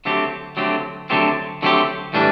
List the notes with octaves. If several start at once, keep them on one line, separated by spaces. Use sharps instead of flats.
D3 F#3 A3 C4 G4
D3 F#3 A3 C4 G4
D3 F#3 A3 C4 G4
D3 F#3 A3 C4 G4
A2 E3 G3 D4